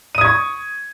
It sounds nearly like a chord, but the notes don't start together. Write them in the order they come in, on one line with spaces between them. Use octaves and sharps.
D#7 D#6 G#6 C#6